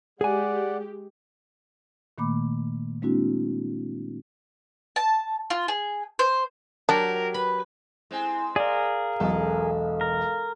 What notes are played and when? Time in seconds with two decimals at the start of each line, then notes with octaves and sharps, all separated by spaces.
0.21 G#3 G4 G#4 D5 F#5 G#5
2.18 A#2 D#3 A3 A#3 B5 D6
3.02 G#3 A#3 C4 D4 E4 F#4
4.96 A5
5.50 F4
5.68 G#4
6.19 C5
6.89 F#3 D4 G4 A#4
7.34 B4 B5
8.11 G#3 C4 E4 G#5
8.56 G#4 A#4 D5 F5
9.20 E1 B1 A4
10.01 A#4